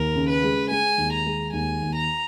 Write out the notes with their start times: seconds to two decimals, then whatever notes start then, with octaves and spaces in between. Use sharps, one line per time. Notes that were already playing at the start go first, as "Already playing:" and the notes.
Already playing: D#2 A#4
0.15 C#3
0.29 B4
0.43 G#3
0.70 G#3 G#5
0.98 D#2
1.13 A#5
1.27 G#3
1.53 D#2 G#5
1.82 D#2
1.95 A#5